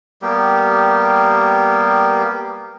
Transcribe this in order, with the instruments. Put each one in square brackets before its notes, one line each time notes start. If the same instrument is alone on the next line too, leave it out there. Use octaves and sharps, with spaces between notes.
[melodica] G3 A#3 B3 G4